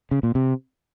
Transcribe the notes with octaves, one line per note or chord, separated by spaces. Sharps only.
C#3
A#2
C3